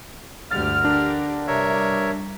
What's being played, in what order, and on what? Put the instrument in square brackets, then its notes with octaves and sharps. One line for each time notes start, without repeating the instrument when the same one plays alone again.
[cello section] D2 G2 G4 [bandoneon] D3 [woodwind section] F6 [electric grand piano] A6
[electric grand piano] D4 [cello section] G4 A#4
[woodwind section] G2 C3 [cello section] G3 [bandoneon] A#4 C#5 E5